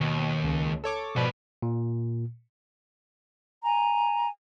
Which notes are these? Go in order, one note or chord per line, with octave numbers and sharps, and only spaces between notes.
D#2 B2
C#2
A4 C#5 D6
G#2 B2 F3 B4 D5
A#2
G#5 A#5